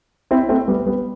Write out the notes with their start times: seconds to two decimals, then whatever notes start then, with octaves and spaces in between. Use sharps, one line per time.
0.31 C4 E4
0.49 A3 C4
0.68 G3 B3
0.86 G3 B3